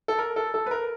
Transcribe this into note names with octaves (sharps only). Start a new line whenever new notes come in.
A4
A#4
A4
A4
B4
A#4